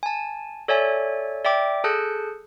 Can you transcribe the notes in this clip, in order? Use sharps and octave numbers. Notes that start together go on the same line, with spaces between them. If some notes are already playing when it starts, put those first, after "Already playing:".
G#5 A5
A4 C#5 D5 E5 G#5
D5 E5 G5 D6
G#4 A4 A5 F#6 G6 C#7